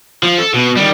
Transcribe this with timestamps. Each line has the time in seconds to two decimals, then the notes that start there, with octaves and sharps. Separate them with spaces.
0.23 F3
0.39 A4
0.54 B2
0.76 D#3 G3